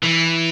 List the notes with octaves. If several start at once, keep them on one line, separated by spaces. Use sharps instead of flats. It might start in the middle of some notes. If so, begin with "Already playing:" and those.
E3